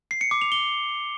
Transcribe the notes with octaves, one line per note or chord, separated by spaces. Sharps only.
C7
C#7
D6
F7
G7